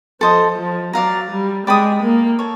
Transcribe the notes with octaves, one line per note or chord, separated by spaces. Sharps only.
F3 A4 C5 D#5
F3
F#3 D5 F5 A#5
G3
G#3 D5 G5 B5 D#6
A#3
A4 C#5